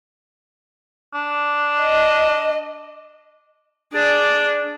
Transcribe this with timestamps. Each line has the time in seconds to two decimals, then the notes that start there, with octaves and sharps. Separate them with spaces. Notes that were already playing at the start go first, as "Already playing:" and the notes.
1.14 D4
1.81 D#5
3.94 D4 G#4 D5